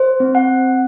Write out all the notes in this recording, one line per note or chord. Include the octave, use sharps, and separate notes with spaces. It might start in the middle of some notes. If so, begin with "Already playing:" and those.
Already playing: C5
C4
F#5
C4